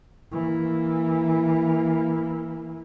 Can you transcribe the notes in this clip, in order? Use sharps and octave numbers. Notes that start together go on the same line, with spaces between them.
E3 A#3